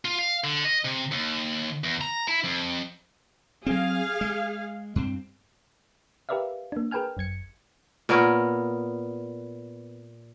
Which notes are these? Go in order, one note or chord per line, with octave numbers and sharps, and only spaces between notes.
F4
F5
D3
D#5
C3
D#2
E2
A#5
E4
F2
F#3 C4 G#4 F5
G#3
G2 C4
G4 A#4 B4 D5 E5 F5
A#3 D4
G#4 A#4 B4 G5 G#5 F6
G1 F#2 G#6 C#7
A#2 B3 A#4 C#5